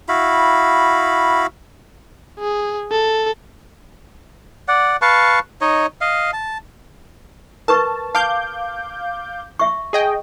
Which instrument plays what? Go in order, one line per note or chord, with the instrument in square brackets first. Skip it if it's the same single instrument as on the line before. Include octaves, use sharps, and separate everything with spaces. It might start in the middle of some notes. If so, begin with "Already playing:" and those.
[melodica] E4 F#4 F5 B5
[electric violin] G#4
A4
[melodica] D5 F#5
B4 F5 A5 C#6
D#4 C#5 D#5
D#5 F5
A5
[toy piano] A#4 B4 C#6 [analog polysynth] A5
[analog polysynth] F5 D6 G6 [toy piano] A5
[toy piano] E5 C#6
[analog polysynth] G#4 D#5 G5